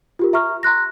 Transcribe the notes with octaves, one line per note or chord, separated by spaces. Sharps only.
F4 G4 A#4
E5 A#5 C#6 F6
A#5 C6 F#6 A#6